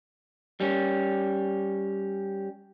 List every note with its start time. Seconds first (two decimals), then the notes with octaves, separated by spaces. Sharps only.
0.60 G3 C#4